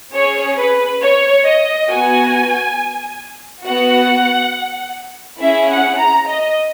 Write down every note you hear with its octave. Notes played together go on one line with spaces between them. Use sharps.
C#4 G#4 C#5
B4
C#5
D#5
B3 F#4 G#5
B3 F#4 F#5
C#4 E4 G#4 E5
F#5
A#5
D#5